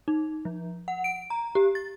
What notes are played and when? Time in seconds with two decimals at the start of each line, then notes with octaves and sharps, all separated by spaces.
0.08 D#4
0.45 F3
0.88 F#5
1.04 D7
1.30 A#5
1.55 G4
1.75 A6